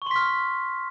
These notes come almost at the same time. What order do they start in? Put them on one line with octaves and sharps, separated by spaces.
C#6 C6 B6 F6